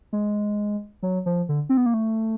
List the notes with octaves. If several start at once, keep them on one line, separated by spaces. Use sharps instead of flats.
G#3
F#3
F3
D3
C4
B3
A#3
A3